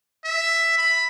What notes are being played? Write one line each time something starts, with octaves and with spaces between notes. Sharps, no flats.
E5
B5